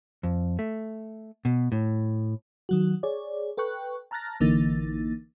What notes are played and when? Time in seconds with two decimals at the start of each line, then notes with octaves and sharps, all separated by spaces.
0.23 F2
0.59 A3
1.45 B2
1.72 A2
2.69 D#3 F#3 F#4
3.03 G#4 C#5 D5
3.57 A4 B4 G5 C#6 F#6
4.11 A5 A#5 F6 F#6 A6 A#6
4.40 A1 D3 E3 A#3 D#4 A6